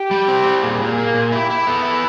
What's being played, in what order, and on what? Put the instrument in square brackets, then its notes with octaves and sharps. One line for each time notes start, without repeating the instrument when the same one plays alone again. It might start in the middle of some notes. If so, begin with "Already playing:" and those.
Already playing: [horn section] G4
[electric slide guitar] G3
C4
G3
[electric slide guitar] A#2 [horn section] G#4
[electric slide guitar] A#2
A#3
A#2
[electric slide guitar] E4 [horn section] G4
[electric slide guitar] E4
[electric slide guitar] B3 [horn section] A4
[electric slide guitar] E4